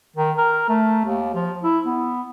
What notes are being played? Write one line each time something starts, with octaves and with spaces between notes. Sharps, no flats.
D#3
A#4
A3
D#2
F3
E4
B3